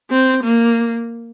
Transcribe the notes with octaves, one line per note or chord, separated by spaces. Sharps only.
C4
A#3